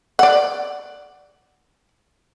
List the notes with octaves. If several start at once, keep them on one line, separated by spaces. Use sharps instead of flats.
D5 F#5